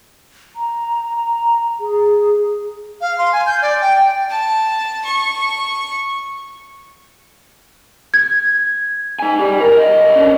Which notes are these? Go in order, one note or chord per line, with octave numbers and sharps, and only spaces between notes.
A#5
G#4
F5
C6
G#5
G6
D5
G5
A5
C#6
G#6
D#4 G#5
G4 D5
A#4
B1 D#5
C#4 D4